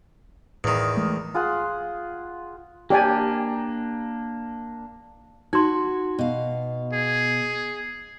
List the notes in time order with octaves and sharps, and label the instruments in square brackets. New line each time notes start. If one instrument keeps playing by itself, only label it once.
[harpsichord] E2 D#3 [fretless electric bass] A2
[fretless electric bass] E3 G#3 A3
[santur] F4 G#4 F#5 C6
[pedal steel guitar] A#3 D4 [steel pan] G4 D5 G#5
[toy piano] D#4 C6 [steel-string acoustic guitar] F#4
[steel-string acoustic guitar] B2 F5
[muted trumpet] G#4